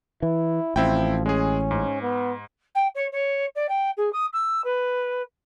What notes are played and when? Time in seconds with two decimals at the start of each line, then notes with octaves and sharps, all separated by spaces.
0.22 E3 E4
0.76 A1 F3 C4 E4 G5
1.26 G#3 C#4 G#4
1.71 G#2
2.02 B3
2.75 G5
2.95 C#5
3.12 C#5
3.55 D5
3.68 G5
3.97 G#4
4.12 D#6
4.33 E6
4.64 B4